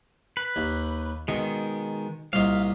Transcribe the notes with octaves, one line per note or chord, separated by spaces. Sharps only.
B4
D#2
B2 D#3 G#3
C2 A#2 D#5 F5